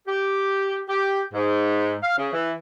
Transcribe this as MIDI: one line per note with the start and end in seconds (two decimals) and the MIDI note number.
0.07 0.79 67
0.89 1.21 67
1.32 1.95 44
2.03 2.14 77
2.17 2.32 49
2.33 2.53 52